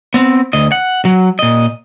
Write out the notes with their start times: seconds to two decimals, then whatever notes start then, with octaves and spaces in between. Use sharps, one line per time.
0.14 B3 C4
0.53 D2 D#5
0.72 F#5
1.05 F#3
1.39 A#2 D#5